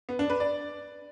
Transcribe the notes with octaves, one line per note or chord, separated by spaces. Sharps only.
B3
D4
B4
D5